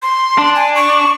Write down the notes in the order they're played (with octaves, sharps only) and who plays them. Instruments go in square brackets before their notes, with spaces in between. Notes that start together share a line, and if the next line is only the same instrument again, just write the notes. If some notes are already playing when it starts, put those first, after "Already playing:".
[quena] C6
[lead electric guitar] D4
[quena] G#5
C#6